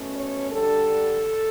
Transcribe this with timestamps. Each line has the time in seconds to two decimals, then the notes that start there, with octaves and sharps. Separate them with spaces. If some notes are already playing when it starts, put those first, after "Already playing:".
Already playing: B2 A3 C#4
0.15 C#5
0.52 D3 G3 D4 A4